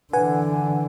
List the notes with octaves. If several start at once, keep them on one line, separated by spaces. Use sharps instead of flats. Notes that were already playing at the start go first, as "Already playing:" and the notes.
D3 E3 B4 F#5 G#5